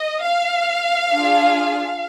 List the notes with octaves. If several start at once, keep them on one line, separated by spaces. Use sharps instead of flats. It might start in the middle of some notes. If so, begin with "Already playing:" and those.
Already playing: D#5
F5
D4 F4 G#4